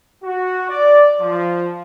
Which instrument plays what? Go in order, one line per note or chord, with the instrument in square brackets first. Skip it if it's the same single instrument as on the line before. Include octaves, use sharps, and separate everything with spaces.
[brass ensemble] F#4
D5
F3